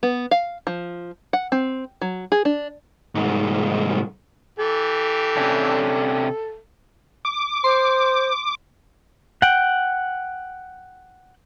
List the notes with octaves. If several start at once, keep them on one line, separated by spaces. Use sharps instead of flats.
B3
F5
F3
F#5
C4
F#3
G#4
D4
C2 G#2
E3 G4 A4
C3 C#4 D4
D6
C5 C6
F#5 G5